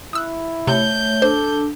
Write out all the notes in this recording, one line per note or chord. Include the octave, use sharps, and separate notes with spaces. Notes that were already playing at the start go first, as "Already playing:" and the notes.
E4 D#6 E6 F#6
C3 A3 C#5 E5 G6
D4 A4 C5